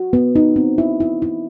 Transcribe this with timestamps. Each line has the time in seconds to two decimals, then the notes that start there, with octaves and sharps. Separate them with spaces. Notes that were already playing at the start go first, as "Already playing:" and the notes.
Already playing: F#4
0.13 B3
0.36 D#4
0.56 C4
0.78 E4
1.00 E4
1.22 E4